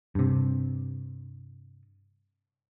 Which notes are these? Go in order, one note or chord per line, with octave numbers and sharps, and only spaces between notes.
G2 C3